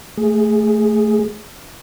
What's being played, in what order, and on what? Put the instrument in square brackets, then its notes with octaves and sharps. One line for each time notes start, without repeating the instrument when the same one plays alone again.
[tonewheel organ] A3 G#4